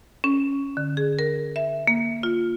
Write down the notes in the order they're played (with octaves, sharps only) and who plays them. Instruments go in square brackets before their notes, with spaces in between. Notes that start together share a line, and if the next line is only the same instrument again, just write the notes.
[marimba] C#4
D3
G#4
A#4
E5
A#3
F4